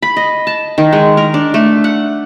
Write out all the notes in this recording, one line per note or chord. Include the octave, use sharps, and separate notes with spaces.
B5
D#5
A5
D#3
G#3
A#4
D4
A3
F#5